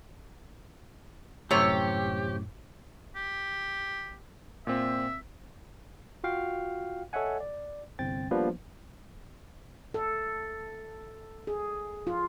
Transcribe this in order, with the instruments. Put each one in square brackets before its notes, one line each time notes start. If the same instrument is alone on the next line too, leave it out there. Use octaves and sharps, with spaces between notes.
[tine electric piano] F#2 A2 [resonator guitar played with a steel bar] C3 C#5 [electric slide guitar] G4
[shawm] G4
[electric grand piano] A#2 C4 [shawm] E5
[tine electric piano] F4 F#4 F5 G5
A4 C#5 D#5 E5 F#5 G#5
D5
G1 C2 C4 G5 A6
F3 G3 A#3 B3 D4 B4
[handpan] A4
G#4
F4